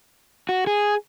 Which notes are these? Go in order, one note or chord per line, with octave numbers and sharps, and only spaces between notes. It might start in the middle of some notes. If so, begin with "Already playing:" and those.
F#4
G#4